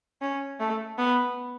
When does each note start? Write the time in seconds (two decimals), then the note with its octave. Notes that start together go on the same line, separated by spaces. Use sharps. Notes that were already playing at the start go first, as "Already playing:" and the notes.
0.21 C#4
0.60 A3
0.98 B3